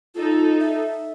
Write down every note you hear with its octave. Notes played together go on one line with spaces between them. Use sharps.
D#4 F4 A4
E5